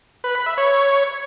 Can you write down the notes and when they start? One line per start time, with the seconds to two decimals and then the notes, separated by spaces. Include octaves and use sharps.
0.24 B4
0.35 B5
0.46 E5
0.58 C#5